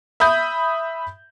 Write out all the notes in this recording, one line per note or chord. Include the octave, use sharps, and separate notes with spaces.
E5 B5 D#6 G6